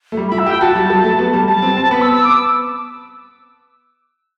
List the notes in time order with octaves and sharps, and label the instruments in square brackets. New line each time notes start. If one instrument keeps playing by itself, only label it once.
[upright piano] A3
G3
[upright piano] E4 [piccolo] B5
[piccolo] E5
[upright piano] G4
[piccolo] G5
[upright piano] F#4 [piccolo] A5
[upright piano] G3
F#3
A3
B3
G3
[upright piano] G3 [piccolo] A5
[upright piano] C4
C4
[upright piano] B3 [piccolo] B5
[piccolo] E6
E6
D6
E6